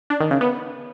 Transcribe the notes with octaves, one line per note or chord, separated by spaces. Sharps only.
D4
D#3
C#3
B3